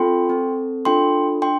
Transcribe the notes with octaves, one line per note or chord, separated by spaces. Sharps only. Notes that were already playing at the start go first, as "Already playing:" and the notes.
Already playing: C4 F4 A4 G5 C6
C4 A4
D4 F4 A4 G5 C6
D4 G5 C6